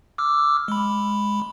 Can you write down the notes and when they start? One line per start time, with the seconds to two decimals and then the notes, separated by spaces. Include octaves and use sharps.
0.18 D6 E6 F6
0.68 G#3 B5